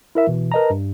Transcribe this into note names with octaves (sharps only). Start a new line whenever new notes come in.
E4 A#4 E5
B2 E3
A#4 B4 D#5 A5 A#5
G2